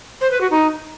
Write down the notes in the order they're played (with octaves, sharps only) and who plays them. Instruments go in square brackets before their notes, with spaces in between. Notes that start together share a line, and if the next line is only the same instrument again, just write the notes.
[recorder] C5
B4
F#4
D#4